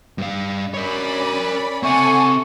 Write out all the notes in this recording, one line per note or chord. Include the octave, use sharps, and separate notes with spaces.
G2 F5
C#4 A#4 C#5 D5 B5
C4 A4 E5 F#5 G#5 C#6